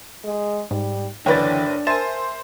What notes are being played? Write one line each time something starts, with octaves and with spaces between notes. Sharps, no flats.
G#3
G#2 G3
F#1 D3 E3 D4 B4 C#5 G5 A6
A#4 C5 E5 G#5 A5